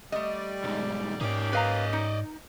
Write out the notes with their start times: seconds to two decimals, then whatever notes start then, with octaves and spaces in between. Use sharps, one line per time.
0.12 G3 A3 D5 D#5
0.64 B1 G#2
1.21 G#2 A#3 C#4 D#4 G4 D5
1.53 B4 D5 D#5 F5 A#5
1.93 D#4